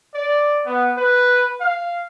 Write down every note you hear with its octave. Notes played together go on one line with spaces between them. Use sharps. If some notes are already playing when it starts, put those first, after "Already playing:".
D5
B3
B4
F5